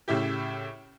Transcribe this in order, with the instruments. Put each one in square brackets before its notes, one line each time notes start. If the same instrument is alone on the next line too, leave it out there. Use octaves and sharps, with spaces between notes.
[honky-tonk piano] A2 C#3 E4 G4